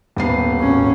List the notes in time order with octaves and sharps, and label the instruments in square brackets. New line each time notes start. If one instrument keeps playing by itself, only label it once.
[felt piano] D#1 B3 C7
[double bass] G#1 C#4